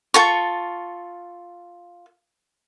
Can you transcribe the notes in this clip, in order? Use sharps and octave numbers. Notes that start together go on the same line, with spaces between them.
F4 A4 C#6